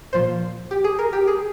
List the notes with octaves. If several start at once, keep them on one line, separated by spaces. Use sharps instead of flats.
A#2 F3 C5
G4
G#4
A#4
G4
G#4